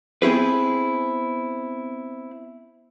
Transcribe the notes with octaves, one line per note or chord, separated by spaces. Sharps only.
B3 C4 E4 G#4 B4